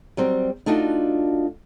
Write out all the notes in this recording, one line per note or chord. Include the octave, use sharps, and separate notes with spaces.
F#3 G3 C4
A3 D4 D#4 F4 F#4